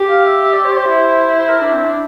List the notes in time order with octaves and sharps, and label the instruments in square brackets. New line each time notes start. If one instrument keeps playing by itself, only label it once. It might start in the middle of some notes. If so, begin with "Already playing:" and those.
Already playing: [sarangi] G4
[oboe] F5
E5
E5
D5
C5
D5
C5
[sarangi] E4
[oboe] C5
A#4
D4
C4
D4